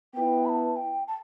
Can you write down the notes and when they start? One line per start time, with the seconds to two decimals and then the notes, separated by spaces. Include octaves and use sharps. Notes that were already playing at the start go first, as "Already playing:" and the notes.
0.14 B3 E4 B4 G5
0.45 B5
0.49 A5
0.76 G5
1.08 A5